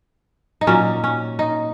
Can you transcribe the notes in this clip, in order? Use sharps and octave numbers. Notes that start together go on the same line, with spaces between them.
D#4
A#2 F#3 A#3 C#4
C#4
D#4